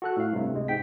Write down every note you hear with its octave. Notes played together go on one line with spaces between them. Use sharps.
F#4 A4 F#6
A2 F5
G2 C3 A3
C#2 C3 G#3
G#2 G5 B6